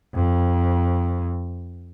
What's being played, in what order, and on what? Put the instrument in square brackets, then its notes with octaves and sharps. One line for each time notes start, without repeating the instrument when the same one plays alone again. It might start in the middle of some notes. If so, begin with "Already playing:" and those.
[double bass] F2